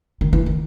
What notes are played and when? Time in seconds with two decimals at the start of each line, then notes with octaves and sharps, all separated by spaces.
0.21 D#3
0.33 E3
0.46 D#3